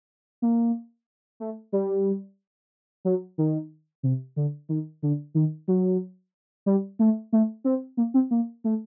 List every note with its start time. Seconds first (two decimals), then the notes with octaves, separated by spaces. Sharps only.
0.42 A#3
1.40 A3
1.72 G3
3.05 F#3
3.38 D#3
4.03 C3
4.36 D3
4.69 D#3
5.03 D3
5.35 D#3
5.68 F#3
6.66 G3
6.99 A3
7.33 A3
7.64 C4
7.97 A#3
8.14 C4
8.31 A#3
8.64 A3